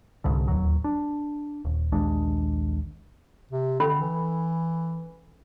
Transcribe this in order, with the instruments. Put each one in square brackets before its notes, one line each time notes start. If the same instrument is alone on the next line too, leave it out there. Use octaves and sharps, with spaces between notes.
[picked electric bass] C2 G#2 D3
D1 G#1 D#2 F#3
D4
D#1
A#1 D#2 G#3 D4
[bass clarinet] C3
[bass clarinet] D3 [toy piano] C#4 A4 B5
[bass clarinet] E3